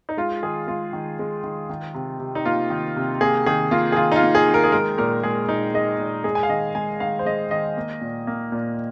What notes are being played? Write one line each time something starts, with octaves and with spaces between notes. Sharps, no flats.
D#4
G#3 F4
D#3 G#4
G#3 F4
D#3
G#3
D#3
D#3
C3
C3
D#4
A#3 F4
D#3
C3
A#3 G#4
D#3 G#4
A#3 F4
G#4
D#3 F4
D#4
F4
A#3
G#4
D#3
A#4
G#4
G#3 A#4
A#2 A#4
G#3 G#4
A#2 D#4
G#3 D#5
A#2
G#3 G#4
G#5
F5
D#3 D#5
G#3 G#5
D#3 F5
C5
G#3 D#5
D#3 D#5
A#3
A#2
A#3
A#2